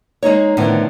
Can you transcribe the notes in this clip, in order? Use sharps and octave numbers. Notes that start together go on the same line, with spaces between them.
G#3 A#3 D#4 C#5
A2 D3 D#3 F3 B3